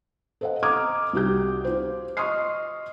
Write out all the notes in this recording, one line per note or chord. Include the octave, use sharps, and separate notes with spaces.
A4 C5 D#5 F5 F#5
D#5 A#5 D6 D#6 F6 G#6
C2 F#4 G4 G6
F4 C5
D#5 C6 C#6 D#6 F6 C7